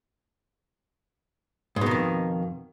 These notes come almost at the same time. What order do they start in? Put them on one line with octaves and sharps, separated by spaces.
G#2 B2 D#3 F2